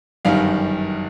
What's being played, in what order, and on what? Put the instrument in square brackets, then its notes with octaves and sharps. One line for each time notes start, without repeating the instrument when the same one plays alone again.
[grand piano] G1 F#2 D#3 G3 F5